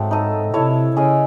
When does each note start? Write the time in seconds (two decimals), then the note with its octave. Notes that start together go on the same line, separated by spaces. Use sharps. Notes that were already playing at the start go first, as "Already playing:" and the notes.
Already playing: G#2 F#3 A3 C4
0.11 D#4 A4 D#5
0.54 C3 E4 A4 C#5
0.97 C#3 C#4 G#4 D#5